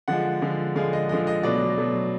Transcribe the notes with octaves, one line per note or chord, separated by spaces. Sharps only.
D3 F3 G#3 F#5
D3 F3 G#3
D3 F3 G#3 F5
D#5
D3 F3 G#3 D#5
D#5
B2 F#3 A3 D5
B2 F#3 A3